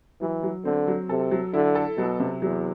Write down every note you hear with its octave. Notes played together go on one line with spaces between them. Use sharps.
E3 F#3
F#3
D3 C4
F#3
C3 A4
F#3
D3 E4
A4
B2 F#3
C3
E2 F#3